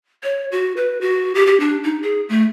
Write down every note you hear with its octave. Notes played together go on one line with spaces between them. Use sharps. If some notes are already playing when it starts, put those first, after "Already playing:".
C#5
F#4
B4
F#4
G4
G4
D4
D#4
G#4
A3